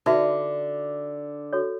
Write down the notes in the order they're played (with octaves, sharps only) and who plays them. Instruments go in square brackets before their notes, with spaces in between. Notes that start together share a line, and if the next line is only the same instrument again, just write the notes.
[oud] D3 [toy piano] D#4 F#4 B4 E5
[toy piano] F#4 A4 C#5